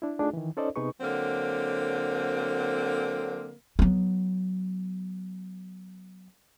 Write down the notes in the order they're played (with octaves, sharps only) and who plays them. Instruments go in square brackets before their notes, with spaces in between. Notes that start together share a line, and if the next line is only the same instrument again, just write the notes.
[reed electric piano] D4 E4
A3 D4 D#4 F4 G#4
D#3 E3
C#4 D#4 A4 C5 D5 D#5
C3 B3 D#4 G#4 B4 C#6
[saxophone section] D3 F#3 A#3 C4
[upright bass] F#3 B3